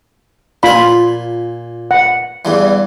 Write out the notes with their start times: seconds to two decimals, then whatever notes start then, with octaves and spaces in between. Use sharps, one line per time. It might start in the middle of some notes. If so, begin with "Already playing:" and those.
0.63 A#2 F4 G#5 B5
1.91 F#5
2.45 E2 G2 E3